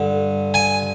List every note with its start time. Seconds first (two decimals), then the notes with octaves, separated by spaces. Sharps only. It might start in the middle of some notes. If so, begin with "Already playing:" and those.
Already playing: G2 D3
0.54 G#5